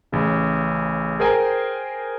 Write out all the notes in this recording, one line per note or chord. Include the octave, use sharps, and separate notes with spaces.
A1 C#3
G#4 A#4 C5 G5 G#5 A#5